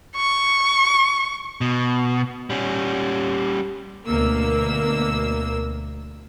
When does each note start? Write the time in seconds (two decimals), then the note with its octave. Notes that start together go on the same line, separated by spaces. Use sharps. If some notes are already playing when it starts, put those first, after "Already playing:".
0.17 C#6
1.61 B2
2.50 G3 C#4
4.07 D2 B2 A#3 E6